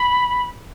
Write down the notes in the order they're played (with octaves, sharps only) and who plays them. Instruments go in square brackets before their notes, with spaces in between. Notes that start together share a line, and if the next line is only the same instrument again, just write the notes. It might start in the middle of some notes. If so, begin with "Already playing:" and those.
Already playing: [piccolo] B5